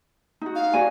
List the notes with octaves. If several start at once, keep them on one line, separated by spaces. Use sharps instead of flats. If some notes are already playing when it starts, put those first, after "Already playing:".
D#4 F#4
F5
F#4 D5 G#5